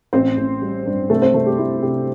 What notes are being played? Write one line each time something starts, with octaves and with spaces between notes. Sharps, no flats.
A1 C4 C5
A1
G3
G2
C2 A3 A4
C4 C5
C2 A3 A4
G4
A3 E4
C3 G4